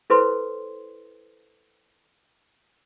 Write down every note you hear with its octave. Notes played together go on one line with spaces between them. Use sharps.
E4 A4 B4 C5 C6